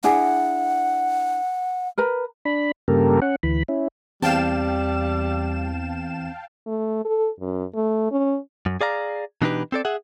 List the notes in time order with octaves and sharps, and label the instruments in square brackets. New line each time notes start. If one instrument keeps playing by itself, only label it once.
[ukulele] D4 E4 G#4 [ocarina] F#5
[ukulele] A#4 B4 A#5
[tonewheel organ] D4 B5
G2 C#3 A#3 G4 A4 A#4
C#4 F#5
D2 E3 B5
C#4 E4
[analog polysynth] E2 E7 [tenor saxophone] G3 [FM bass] C4 [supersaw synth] F5 G5 A5
[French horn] A3
A4
F#2
A3
C#4
[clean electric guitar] F#2
G#4 D5 F5 A#5
B2 E3 D4 D#4 G4 B4
C4 A4 D5
G#4 E5 F#5